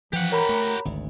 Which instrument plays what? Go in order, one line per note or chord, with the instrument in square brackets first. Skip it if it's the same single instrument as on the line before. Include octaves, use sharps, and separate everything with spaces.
[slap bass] E3 [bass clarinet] F3 [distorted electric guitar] G4 F#5
[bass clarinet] A#4 [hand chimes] C#5 A#5 B5
[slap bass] A3
G#1 D2